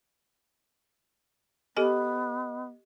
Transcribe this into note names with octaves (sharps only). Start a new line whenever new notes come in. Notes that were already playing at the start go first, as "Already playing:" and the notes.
B3 G4 A4 D#5 G#5